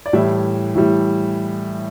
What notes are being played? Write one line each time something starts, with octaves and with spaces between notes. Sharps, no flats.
D5
A2 E3 G3 E5
A2 E3 G3